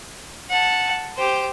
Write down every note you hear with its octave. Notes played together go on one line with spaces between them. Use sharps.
F#5 A5
G4 C5